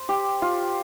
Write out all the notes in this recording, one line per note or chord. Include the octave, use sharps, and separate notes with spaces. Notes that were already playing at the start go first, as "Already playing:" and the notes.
Already playing: C5
G4
F4